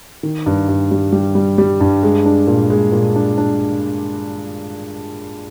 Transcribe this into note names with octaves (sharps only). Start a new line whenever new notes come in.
D#3
G2
G2
G3
G3
G3
G3
G2
G#3
D4
A#2
G#3
A#2
D4
D4